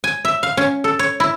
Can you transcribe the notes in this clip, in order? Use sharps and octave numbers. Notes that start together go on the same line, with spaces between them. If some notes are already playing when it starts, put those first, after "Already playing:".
G#5
E5
F5
C#4
A4
C#5
E4